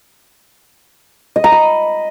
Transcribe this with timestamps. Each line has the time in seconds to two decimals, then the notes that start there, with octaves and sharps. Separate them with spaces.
1.36 D#5
1.44 A#5
1.52 B5